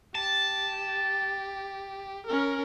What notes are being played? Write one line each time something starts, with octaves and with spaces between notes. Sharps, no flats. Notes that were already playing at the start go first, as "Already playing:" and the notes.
G4 A5
C#4 A#4